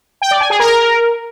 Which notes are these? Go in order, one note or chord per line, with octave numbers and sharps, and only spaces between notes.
G5
D5
G#5
G#4
A#4